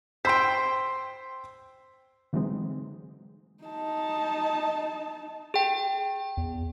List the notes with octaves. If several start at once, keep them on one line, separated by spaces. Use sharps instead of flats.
C5 G5 C6 E6 B6
D3 E3 F#3 G#3 C4 D#4
D#4 A5
G#4 G5
E2